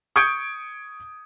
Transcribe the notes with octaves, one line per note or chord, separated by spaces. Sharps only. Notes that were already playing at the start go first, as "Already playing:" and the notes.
C#6 D#6 G6 G#6 C#7 D7